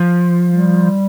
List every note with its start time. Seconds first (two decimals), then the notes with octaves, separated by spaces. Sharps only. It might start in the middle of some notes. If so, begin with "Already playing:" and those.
Already playing: F3
0.49 G3